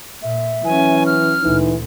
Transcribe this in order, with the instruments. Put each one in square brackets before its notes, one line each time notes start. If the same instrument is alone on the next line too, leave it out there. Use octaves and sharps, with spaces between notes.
[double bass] A#2 [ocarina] E5
[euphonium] E3 [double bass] F#3 C#4 [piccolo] G#5
[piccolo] F6
[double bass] D2 A#2 [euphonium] E3 [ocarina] D#4